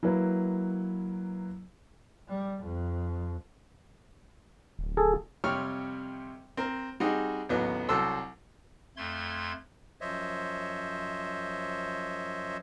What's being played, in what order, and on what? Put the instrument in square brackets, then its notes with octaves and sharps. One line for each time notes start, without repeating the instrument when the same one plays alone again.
[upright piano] F#3 A#3 E4 B4
[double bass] G3
F2
[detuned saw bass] D1
[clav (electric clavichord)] G#4 A4
[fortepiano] F2 C3 G3 C#5 F6
C4 A#4
G3 C4 D#4 F#4 G#4
A1 D#2 F#3 B3
C2 F#3 A4 C5 E6
[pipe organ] F2 A3 C6 G#6
[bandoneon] F#2 F3 C5 C#5 D#5 E5